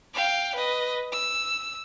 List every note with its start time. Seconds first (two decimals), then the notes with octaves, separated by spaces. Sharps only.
0.14 F5 G5
0.55 B4 D#5
1.12 E6